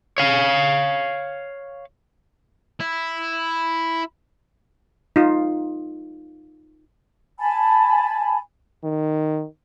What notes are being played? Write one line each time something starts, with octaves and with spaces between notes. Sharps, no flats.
C#5 F5
E4
D#4 F4
G#5 A5 B5
D#3